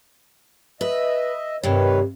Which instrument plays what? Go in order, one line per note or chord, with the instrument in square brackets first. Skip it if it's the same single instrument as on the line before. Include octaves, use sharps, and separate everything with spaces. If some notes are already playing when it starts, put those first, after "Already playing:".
[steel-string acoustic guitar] B4 [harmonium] D#5 E5
[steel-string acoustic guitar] G2 C3 [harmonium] D#3 B4 C#5